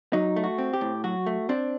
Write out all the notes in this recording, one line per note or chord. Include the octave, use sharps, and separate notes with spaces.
F#3 D#4
A3
F#4
C4
G4
A2
F#3 F#4
A3
C4 D4